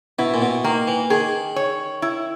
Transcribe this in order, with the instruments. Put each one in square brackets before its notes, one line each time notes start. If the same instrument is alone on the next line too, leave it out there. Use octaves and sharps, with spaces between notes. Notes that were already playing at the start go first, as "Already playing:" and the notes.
[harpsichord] B2 [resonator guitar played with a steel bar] E4
[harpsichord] A#2
B2
[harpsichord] D#3 [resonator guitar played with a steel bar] A#3
[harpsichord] E3
[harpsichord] D#3 [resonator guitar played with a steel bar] G#4
[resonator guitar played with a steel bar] C#5
E4